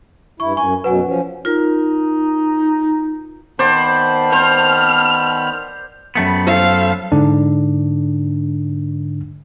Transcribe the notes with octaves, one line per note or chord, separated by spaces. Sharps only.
G2 E4 C#6
F#2 G#5 C#6
F#2 B2 F#3 B4 F#5 G#5
F3 C#4
D#4 F4 A#4
D#3 B3 C5 D5 A5 B5
C5 F6
F#2 C3 G3 A3 B3 B5
A4 C5 F5
G#2 D3 D4